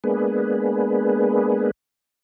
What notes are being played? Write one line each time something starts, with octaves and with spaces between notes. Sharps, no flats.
G#3 A#3 B3 D4 G#4 B4